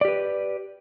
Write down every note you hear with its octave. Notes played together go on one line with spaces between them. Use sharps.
G4 B4 D5